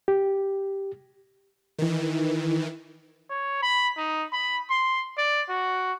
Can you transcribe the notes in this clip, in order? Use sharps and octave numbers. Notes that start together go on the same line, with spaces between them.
G4
D#3 E3
C#5
B5
D#4
B5
C6
D5
F#4